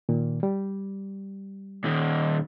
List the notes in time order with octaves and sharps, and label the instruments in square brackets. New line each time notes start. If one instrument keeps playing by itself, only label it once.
[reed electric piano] A#2 D#3
G3
[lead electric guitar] A#2 D#3